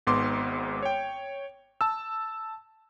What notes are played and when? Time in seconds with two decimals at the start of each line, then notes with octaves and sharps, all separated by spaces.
0.07 G#1 G#2 B3 C6 D6
0.83 C#5 G5
1.81 A5 E6